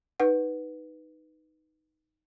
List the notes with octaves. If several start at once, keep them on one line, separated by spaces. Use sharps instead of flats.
D#4 B4 F#5